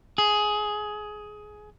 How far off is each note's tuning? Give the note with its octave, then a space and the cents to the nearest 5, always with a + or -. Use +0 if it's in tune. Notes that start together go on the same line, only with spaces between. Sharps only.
G#4 +15